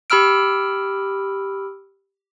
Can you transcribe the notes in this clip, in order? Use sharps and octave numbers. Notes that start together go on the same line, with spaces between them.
G4 B5 E6 F6 D7